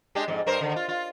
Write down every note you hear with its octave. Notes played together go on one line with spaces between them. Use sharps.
G#3 D4 G4
F2 G#2
G2 A#4 C5
D3 D#3
F4
F4